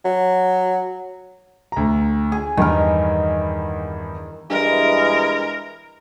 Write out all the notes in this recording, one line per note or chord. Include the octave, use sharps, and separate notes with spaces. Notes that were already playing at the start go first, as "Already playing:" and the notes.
F#3
D2 A#5
G#4
E2 G2 D#3 A#4
G2 E3 G#3 A#4